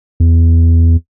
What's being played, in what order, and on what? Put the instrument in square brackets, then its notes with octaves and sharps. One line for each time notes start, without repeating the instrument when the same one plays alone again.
[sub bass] E2